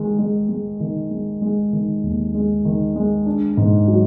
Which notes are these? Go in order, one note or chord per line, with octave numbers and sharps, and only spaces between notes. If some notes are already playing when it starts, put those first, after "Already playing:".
Already playing: D#3 G#3
G#3
G#3
D#3
G#3
G#3
D#3
D#2
G#3
D#3
G#3
D4
G#2
F#3